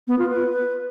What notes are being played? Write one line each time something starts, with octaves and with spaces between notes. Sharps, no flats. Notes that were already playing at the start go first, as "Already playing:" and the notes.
B3
F4
B4